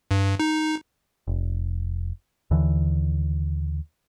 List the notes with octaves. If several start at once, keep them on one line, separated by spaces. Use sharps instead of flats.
G2
D#4
F1
D#2 D3 E3